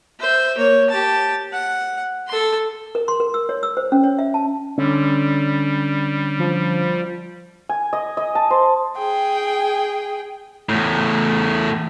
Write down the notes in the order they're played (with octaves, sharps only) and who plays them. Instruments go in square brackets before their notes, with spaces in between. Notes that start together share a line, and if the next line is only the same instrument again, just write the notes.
[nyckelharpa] C5 E5
A#3 C#5
G4 A5
F#5
A4 C6
[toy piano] A#4
C6
A#4
E6
C#5
E6
C5
C#4
C#5
E5
A5
[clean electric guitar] D3 C#4 [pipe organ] G3
[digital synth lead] F3
[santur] G#5
D#5
D#5
A5
C5
[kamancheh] G#4 G5
[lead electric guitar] E2 A2